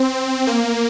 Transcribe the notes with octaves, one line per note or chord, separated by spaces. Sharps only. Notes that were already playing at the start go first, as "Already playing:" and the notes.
Already playing: C4
A#3